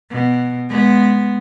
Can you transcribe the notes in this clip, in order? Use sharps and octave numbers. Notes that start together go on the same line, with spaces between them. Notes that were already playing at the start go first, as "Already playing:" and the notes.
B2
G#3 B3